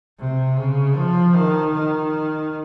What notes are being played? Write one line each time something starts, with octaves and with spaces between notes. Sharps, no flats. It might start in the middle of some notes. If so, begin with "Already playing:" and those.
C3
C#3
F3
D#3
D#3